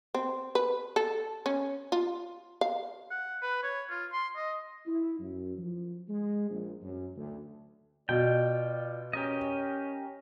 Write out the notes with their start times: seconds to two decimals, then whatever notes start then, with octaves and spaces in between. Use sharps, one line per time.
0.14 C4
0.55 B4
0.96 A4
1.46 C#4
1.92 F4
2.61 F5
3.11 F#5
3.42 B4
3.63 C#5
3.90 F4
4.12 C6
4.36 D#5
4.86 E4
5.19 F#2
5.57 F3
6.08 G#3
6.49 A#1
6.81 F#2
7.16 D2
8.09 B2 F4 D5 G5
9.13 C#4 G4 A#4 D#5